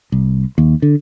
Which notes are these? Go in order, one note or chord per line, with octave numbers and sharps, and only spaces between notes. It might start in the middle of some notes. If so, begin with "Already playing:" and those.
C2
D#2
D3